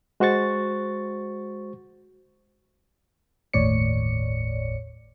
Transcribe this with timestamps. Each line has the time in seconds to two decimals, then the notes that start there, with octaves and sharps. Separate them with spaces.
0.20 G#3 F#4 C5 C#6 A6
3.53 G1 D#2 A2 C#5 D5 C#7